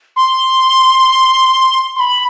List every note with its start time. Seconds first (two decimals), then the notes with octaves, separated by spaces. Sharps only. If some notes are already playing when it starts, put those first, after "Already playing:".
0.16 C6
1.96 C6
2.00 B5